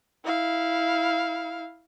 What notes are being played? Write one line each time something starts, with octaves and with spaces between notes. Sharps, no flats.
E4 F5